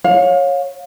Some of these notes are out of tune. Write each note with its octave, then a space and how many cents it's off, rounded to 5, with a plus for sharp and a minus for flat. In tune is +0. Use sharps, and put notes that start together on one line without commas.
C#5 -10 F5 +30